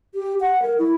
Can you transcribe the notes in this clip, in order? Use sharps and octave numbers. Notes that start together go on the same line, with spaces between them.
G4
F#5
A#4
E4